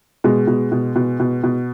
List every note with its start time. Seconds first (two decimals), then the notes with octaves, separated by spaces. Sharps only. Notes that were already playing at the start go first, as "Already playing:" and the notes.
0.24 B2 G#3
0.47 B2
0.72 B2
0.96 B2
1.20 B2
1.43 B2